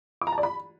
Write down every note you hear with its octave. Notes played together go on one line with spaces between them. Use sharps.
D6
A#5
A5
D5
B5